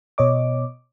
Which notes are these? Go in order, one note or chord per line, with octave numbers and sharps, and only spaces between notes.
B2 C#5 D#5 D6